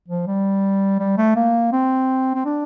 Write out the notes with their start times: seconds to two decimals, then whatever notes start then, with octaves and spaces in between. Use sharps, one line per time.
0.08 F3
0.27 G3
0.99 G3
1.18 A3
1.36 A#3
1.72 C4
2.34 C4
2.45 D4